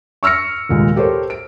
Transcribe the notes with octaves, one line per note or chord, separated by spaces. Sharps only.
C#6 E6 F6 A#6 C#7
F1 D#2 A#2 G#3
G4 A4 A#4 C5 C#5
D7